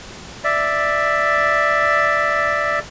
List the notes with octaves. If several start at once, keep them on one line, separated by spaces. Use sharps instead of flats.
D5 E5